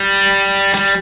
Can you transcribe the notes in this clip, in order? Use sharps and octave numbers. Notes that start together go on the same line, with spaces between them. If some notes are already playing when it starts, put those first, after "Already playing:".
Already playing: G3
G3